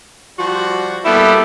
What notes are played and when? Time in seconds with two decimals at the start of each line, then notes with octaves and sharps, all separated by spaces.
0.38 F3 G3 F#4
1.05 G3 A#3 B3 E4 A4